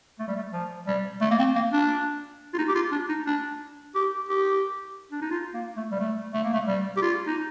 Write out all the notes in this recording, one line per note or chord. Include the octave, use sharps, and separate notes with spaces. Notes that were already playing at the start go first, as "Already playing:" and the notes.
A3
G3
A3
F3
G3
A3
A#3
C4
A#3
D4
F4
D#4
G4
F4
D4
D#4
D4
G4
G4
D4
D#4
F4
A#3
A3
G3
A3
A3
A#3
A3
G3
G4
F4
D#4